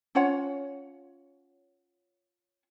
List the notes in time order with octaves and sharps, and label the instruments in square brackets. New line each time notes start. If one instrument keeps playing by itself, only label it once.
[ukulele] C#4 F4 C#5 F#5